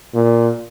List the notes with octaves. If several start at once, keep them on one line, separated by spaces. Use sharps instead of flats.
A#2